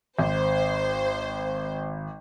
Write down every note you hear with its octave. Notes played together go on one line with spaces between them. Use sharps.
G#1 C5